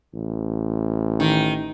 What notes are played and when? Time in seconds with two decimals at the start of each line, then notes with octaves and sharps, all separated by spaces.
0.14 A1
1.20 D#3